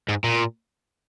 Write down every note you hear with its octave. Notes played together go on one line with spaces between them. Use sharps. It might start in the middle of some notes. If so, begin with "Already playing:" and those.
G#2
A#2